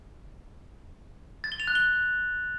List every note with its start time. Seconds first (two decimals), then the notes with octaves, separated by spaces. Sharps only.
1.44 A6
1.52 G7
1.60 F7
1.67 F#6
1.75 G7